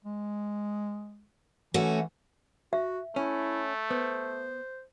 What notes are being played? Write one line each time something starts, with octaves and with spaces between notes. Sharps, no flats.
G#3
E3 A3 C#4 F#4
F#4 E5
A3 C#4 E4
B3 C5